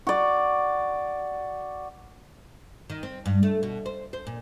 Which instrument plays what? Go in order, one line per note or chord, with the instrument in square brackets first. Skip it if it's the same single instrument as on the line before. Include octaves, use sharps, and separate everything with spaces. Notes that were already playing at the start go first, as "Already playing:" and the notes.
[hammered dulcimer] F#4 D5
[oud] D#3
C4
G2
A3
B2
C5
C5
A#2